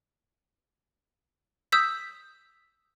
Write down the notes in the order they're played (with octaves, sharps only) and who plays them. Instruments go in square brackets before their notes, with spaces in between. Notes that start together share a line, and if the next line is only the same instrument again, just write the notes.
[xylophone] D#6 E6 G6 B6